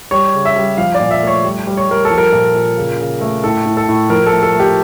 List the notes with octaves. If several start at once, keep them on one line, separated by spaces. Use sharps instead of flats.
G3 C#5
C#3
E5
G3
F3 F5
D5
A#2
E5
A3 C#5
G3
G3
C#5
G3 A#4
A4
F3
A#4
A#2
A#2
C#3
C#3
A3
A2 A4
A2
A4
A2
F3 A#4
A4
A3
A4
A3
G4